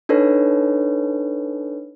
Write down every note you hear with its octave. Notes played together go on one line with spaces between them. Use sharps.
D4 D#4 A4 B4 C#5